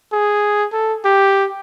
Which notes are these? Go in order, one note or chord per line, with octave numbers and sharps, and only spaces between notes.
G#4
A4
G4